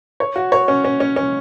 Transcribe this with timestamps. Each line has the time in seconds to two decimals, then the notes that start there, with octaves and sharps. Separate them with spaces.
0.20 C#5
0.36 F#4
0.52 C#5
0.68 C#4
0.85 C#4
1.00 C#4
1.16 C#4